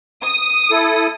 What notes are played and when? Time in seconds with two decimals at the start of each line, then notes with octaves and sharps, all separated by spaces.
0.23 D#6
0.71 E4 A4